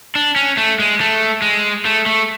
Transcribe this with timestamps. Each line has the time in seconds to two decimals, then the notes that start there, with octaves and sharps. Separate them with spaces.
0.15 D4
0.36 C#4
0.57 A3
0.79 G#3
1.01 A3
1.42 G#3
1.85 A3
2.06 A3